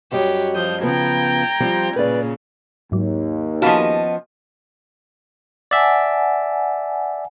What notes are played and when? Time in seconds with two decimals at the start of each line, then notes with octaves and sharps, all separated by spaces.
0.12 F#2 G3 F#4 G4 C#5 D#5
0.55 F3 D#6 G6
0.83 C#3 F3 B3 G5 A#5 G#6
1.60 F3 G3 C4
1.96 A#2 C#3 B4 D5
2.92 D#2 G#2 F#3
3.62 F3 B3 C#4 F#4 D#5 F5 A5 B5
5.71 D5 E5 F#5 G#5 A5